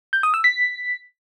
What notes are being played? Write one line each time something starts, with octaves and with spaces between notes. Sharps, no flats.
G6
D#6
E6
B6